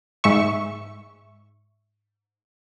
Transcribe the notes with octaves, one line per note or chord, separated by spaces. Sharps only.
G#2 E5 C#6